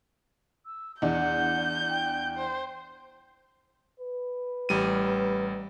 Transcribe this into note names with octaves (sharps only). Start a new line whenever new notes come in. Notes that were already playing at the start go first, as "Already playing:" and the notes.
E6
E2 D4 F#5 G6
G5
C5
B4
A1 G3 D#7